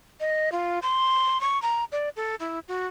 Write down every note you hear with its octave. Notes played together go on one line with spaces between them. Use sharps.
D#5
F4
C6
C#6
A#5
D5
A4
E4
F#4